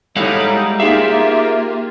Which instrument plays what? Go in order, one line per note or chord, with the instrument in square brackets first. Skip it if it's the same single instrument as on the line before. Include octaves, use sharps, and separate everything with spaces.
[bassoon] A2 [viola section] G3 D#4 E4 [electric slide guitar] G#3 F5 F#5
[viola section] A#3 F4 [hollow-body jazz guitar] D#4 G#4 F5 [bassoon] G4 [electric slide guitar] E5